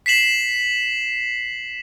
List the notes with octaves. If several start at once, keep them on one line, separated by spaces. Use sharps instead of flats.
B6 C7 E7 F#7